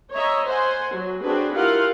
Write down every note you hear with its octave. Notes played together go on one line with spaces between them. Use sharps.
C#5 D#5 E5 A#5
C5 F#5 G#5
F#3
C4 D4 F#4 G#4 B4
E4 F4 G4 A#4 F5 F#5